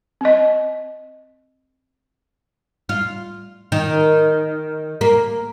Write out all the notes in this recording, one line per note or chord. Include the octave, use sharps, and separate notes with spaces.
C4 D#5
F4
D#3
A#3